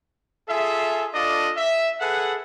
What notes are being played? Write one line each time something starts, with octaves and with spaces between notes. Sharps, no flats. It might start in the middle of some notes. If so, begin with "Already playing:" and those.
F4 G#4 A4 E5
D4 F4 A4 D5 D#5
E5
G#4 A4 B4 F#5